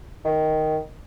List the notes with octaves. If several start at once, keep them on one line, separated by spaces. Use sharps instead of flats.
D#3